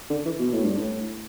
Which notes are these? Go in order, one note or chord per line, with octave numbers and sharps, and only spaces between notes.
D3
E3
B2
A2
G2
A2